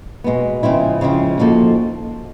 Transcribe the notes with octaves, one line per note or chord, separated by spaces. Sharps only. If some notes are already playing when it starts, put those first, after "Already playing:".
B2 G#3 B3
C#3 F3 G#3 C4 E4
C#3 F3 G#3 C4 E4
F3 A#3 D#4 F#4 A4